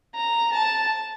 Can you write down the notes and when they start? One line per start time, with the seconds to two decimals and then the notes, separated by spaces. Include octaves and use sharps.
0.15 A#5
0.53 A5